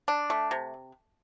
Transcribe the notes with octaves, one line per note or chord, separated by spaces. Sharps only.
D4
A3
C3